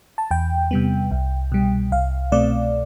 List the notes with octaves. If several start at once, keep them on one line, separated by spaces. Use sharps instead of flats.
A5
E2 G5
C3 G3 B3
C2
B2 G3
C2 F5
B2 A3 C4 D5